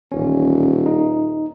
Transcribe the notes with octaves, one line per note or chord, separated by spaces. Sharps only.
D#1 A1 C#4
D#4